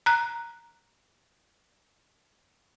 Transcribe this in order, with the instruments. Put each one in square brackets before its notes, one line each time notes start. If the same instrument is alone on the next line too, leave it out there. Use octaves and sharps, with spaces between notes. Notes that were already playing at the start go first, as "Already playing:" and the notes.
[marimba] A#5 F#6